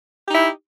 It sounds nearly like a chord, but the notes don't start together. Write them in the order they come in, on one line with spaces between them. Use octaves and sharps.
G4 D#4 E4